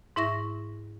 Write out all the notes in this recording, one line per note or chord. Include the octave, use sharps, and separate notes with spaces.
G#2 E4 E5 C#6 A#6